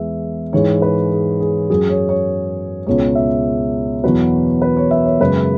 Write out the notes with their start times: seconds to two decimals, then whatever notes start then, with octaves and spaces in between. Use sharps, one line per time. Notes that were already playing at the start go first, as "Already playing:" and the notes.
Already playing: E2 E3 G#3 E5
0.53 G#2 E3 G#3 C#5
0.82 B4
1.11 G#4
1.40 G#4
1.70 F#2 F#3 G#4
1.89 C#5
2.09 C#5
2.86 C#2 B2 G#3 C#5
3.15 E5
4.04 E2 B2 F#3 B4
4.62 B4
4.77 C#5
4.91 E5
5.05 C#5
5.20 F#2 C#3 G#3 B4